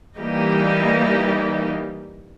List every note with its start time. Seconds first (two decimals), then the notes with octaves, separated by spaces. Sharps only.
0.17 E3 G3 A#3 D#4 G4